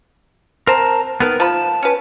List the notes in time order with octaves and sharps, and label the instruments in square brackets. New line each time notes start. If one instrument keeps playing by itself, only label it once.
[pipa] C4 [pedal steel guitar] A#4 A5 A#5
[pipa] D#3 [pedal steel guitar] B3 A#4 B4
[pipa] F3 B5 [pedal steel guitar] A5
[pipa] C#4 B4